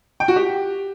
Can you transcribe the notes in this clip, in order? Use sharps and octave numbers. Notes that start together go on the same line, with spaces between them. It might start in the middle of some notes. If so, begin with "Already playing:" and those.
G5
F#4
G4